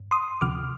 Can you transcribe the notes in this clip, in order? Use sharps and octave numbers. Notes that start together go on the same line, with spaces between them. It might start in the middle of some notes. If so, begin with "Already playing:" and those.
Already playing: G2
C6 D#6
D2 C3 F3 D6 F6